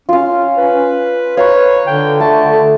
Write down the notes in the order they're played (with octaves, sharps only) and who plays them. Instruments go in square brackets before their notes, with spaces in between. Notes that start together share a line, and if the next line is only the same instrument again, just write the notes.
[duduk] C#4 [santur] F4 F5
[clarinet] B4
[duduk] B4 [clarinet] C#5 [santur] F5 A#5 C#6
[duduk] D3 [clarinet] G5
[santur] A3 [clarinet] A5